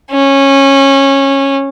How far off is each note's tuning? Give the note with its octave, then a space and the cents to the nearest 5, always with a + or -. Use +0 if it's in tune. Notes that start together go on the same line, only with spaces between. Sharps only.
C#4 -15